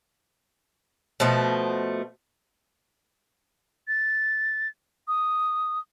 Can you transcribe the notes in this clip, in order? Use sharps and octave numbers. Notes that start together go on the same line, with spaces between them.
B2 F3 A3
A6
D#6